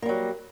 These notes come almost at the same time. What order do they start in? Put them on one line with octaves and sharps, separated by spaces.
A#3 G3 F#3